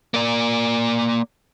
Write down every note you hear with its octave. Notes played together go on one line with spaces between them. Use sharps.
A#3 D5